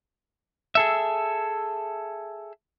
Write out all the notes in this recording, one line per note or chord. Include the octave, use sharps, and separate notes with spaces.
G#4 A4 E5